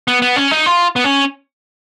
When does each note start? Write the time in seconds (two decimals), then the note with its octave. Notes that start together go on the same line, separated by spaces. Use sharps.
0.08 B3
0.22 B3
0.36 C#4
0.51 D#4
0.66 F4
0.96 B3
1.04 C#4